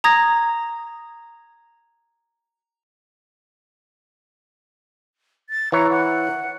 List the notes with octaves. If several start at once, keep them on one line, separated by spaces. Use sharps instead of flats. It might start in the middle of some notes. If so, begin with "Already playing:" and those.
A#5 D#6 G#6 A#6
A6
E3 C#5 A#5
F#5